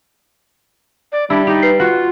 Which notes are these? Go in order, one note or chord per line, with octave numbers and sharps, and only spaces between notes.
D5
G3 D4 E4
D#4 G4
B4 C7
F4 F#4